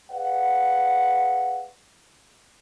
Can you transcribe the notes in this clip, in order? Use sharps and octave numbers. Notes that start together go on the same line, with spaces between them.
G#4 B4 D5 F5 F#5